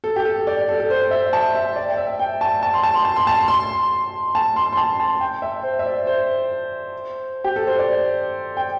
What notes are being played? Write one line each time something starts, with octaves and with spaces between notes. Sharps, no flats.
A4
G4
A4
D5
A4
A4
C5
E5
A5
E5
D5
G5
E5
G5
A5
A5
C6
A5
C6
A5
C6
A5
C6
A5
C6
C6
A5
A5
G5
E5
C5
E5
D5
C5
G4
A4
C5
D5
G5